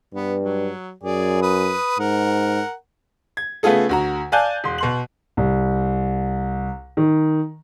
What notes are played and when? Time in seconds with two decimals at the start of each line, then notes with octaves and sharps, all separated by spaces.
0.14 G2 B3
0.44 F#3
1.03 F#2 G#4 D5
1.42 B4 D#6
1.99 G#2 A#4 F#5
3.37 G#6
3.63 C#3 A3 B3 F4 G#4 A4
3.89 D2 F#4 A#5
4.32 D5 F5 G#5 A5 F#6 G6
4.64 E1 C6
4.78 B2 C6 F#7
5.37 C2
6.97 D#3